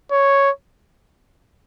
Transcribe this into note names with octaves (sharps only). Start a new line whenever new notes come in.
C#5